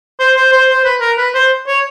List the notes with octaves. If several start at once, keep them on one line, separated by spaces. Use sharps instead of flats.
C5
C5
C5
C5
B4
A#4
B4
C5
C#5